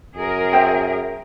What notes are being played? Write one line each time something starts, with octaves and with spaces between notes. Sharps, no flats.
F#2 G#4 A#4
C5 E5 G5